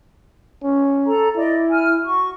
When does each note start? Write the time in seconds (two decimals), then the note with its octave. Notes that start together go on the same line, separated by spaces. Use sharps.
0.63 C#4
1.06 A4 A#5
1.36 E4 D5 D#5
1.69 G#5 F6
2.03 F#4 C#6